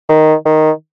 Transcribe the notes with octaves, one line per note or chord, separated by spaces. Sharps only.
D#3
D#3